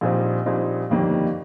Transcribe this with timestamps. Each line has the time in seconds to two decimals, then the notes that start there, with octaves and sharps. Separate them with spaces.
0.01 A#1 A#2 G3 C4 D#4
0.46 A#1 A#2 G3 C4 D#4
0.90 G1 F2 D#3 G3 A#3